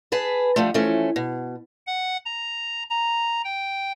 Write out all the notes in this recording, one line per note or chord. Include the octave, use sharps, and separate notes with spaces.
G#4 B4 A5
D3 F3 G3 A3
E3 F3 A3 C#4
B2
F#5
A#5
A#5
G5